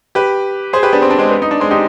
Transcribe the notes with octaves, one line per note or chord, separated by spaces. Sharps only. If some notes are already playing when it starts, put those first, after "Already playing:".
G4 B4
G#4 C5
G4 B4
B3 D4
C4
D4
G#3 C4
B3
D#4
D4
G#3 C4
D#4 G4